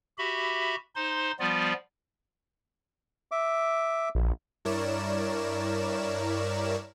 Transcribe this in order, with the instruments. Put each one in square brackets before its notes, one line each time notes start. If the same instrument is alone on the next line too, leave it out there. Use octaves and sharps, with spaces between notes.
[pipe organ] F#4 G4 E5 B5
D#4 C5 C6
F3 G3 B3 F4 D5
[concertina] E5 D6
[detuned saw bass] A#1
[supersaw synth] G2 E4 A#4 C#5 D5 E7